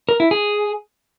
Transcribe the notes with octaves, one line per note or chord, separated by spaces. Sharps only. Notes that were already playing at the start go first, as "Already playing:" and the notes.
A#4
E4
G#4